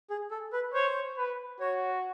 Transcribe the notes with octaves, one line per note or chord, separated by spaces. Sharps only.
G#4
A4
B4
C5 C#5
B4
F#4 C#5